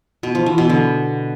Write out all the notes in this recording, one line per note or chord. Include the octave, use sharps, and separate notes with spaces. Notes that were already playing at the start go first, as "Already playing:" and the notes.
B2
F3
E3
B2
D3